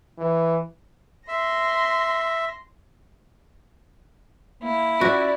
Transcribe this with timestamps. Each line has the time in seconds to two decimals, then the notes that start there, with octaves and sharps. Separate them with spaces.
0.19 E3
1.28 E5 C6 A#6
4.63 A#3 E4
5.01 C#4 F#4 D5